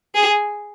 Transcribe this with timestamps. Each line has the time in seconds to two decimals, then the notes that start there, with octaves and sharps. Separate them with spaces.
0.15 G#4